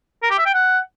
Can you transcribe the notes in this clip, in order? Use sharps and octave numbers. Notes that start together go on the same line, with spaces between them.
A#4
G4
E5
G5
F#5